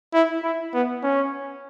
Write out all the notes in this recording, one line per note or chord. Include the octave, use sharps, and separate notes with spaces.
E4
E4
B3
C#4